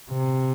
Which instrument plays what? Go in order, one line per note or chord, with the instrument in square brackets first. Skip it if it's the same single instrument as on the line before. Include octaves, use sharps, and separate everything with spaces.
[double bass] C3